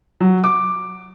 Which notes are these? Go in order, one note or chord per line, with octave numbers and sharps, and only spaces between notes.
F#3
D6